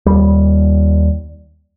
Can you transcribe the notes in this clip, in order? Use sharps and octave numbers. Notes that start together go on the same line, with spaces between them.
D#2 G3